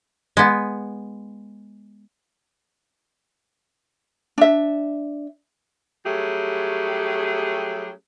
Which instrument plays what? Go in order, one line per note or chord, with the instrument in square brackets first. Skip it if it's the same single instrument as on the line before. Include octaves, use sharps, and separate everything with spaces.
[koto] G#3 B3
[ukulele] D4 E5
[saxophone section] F#3 G3 A3 C#4 G4 G#4